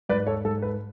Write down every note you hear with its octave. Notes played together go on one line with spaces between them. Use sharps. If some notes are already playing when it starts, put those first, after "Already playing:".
G#2 B4 D5
A4 C#5
G#2 A4
B4